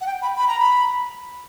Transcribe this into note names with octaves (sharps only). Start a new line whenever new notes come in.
F#5
G5
B5
B5
A#5
B5